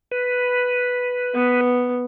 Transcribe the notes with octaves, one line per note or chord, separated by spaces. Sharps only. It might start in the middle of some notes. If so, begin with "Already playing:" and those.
B4
B3